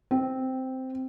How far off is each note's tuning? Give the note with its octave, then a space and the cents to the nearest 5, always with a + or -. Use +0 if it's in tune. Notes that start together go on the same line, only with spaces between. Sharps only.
C4 -5